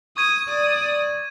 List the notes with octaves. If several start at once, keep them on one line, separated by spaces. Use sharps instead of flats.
C#6 D#6 G#6 D#7
D5 D#6